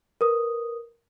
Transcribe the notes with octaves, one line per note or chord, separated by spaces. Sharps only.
A#4 B4 D#6